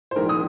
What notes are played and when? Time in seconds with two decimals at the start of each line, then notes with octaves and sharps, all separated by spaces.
0.11 C5
0.16 A#1 G#2 D#3 A#4
0.29 D#6